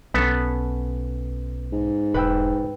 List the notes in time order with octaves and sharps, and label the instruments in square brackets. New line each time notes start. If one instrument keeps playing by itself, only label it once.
[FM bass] B1 [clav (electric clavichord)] B3 A4 [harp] C#4 B6
[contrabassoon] G#2
[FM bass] E1 [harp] B4 G5 E6